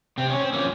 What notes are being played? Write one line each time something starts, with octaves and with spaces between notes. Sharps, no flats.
C3 C4
C#4
C4
F3 A#3 C#4